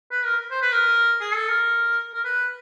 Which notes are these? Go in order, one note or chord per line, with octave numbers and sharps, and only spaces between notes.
B4
A#4
C5
B4
A#4
G#4
A4
A#4
A#4
B4